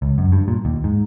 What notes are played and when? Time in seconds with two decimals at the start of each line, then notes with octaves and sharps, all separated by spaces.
0.02 C#2
0.18 F#2
0.32 G2
0.48 A#2
0.65 D#2
0.84 G#2